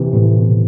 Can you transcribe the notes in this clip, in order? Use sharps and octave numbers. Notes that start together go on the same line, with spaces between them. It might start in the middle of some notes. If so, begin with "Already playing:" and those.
Already playing: C3 E3
A2
B2